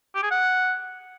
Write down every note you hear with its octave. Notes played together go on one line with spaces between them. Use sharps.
G4
G#4
F#5